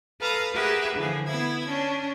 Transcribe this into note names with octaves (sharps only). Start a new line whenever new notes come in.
A4 B4 F5 A#5 D#6
G4 G#4 A#4 B4 E5 F#5
D3 E3 F3 G#4
B3 E4 G#6
C#4 D4